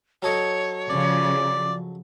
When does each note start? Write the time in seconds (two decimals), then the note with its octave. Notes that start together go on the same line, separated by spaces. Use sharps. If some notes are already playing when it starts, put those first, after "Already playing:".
0.22 F#3 A4 C#5 D#5
0.90 C#3 F3 D5